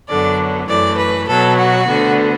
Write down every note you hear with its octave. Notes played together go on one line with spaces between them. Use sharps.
F#2 D3 F#3 B3 D5
F#2 E3 A3 D5
B4
B2 F#3 B3 A4
F#4
D2 D3 B3